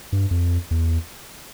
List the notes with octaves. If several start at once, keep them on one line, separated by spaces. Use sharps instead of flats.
G2
F2
E2